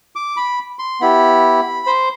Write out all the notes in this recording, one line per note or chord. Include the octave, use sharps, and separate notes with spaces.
D6
B5
C6
B3 E4 G4 B5
C5